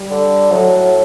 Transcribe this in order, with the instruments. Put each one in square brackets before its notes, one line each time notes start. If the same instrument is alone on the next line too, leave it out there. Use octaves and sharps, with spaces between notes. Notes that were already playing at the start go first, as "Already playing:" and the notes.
Already playing: [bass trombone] G3
[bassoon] D3
[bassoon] A2 [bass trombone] F#3